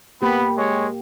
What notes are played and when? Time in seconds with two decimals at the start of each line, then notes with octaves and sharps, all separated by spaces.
0.22 A#3 B3 G4 B5
0.58 G#3 C#5